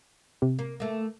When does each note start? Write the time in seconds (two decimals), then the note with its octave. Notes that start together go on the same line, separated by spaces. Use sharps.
0.42 C3
0.59 A#3
0.80 A3 A#3